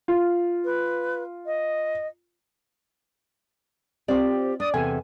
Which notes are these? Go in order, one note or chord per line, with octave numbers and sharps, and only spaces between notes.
F4
B4
D#5
C4 F4 G4 D5
D4 D5 D#6
E2 C3 A4 G#5